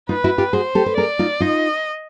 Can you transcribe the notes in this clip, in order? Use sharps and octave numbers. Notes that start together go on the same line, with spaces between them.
D#4 F4 B4
E4 F#4
F4 G4
F#4 G#4 C5
G4 A4
B4
G#4 A#4 D5
D#4 F4
D#4 F4 D#5